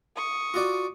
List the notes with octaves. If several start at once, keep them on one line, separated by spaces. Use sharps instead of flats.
C#6 D#6
F4 F#4 D5